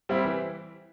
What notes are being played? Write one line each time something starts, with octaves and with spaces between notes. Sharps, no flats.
G3 C4 E4
E3